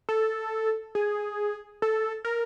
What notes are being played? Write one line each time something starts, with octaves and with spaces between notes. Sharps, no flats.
A4
G#4
A4
A#4